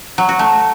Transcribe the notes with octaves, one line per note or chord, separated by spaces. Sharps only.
F#3
F#4
A3